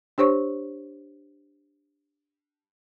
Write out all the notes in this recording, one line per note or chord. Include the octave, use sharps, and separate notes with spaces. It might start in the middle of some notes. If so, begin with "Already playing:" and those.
D4 G4 C5 C#5 C#6